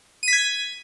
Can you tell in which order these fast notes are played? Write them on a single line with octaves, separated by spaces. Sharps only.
D#7 B6 G#6